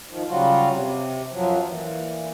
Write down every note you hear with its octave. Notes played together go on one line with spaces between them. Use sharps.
D#3 F3
C#3 F#3 G3 F4 F#4
C3
F#2 F3 F#3
A#2 E3